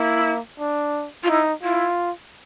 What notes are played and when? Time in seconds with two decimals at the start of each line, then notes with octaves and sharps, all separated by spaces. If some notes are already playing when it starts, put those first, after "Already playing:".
Already playing: A#3 E4
0.60 D4
1.23 F4
1.28 D#4 E4
1.63 E4 F4